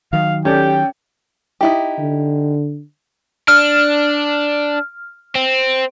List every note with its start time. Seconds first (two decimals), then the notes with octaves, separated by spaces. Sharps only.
0.13 D#3 F#3 F5
0.45 C#4 G4 A4 D5 G5
1.61 D#4 E4 G4
1.98 D3
3.48 D4 F6
5.35 C4